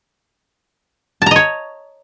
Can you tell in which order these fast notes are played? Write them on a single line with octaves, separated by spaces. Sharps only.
A5 A#5 D#5 C#5